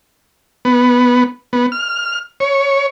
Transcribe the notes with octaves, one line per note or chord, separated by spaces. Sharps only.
B3
B3
F6
C#5